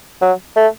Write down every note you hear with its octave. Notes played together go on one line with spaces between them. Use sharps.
F#3
A3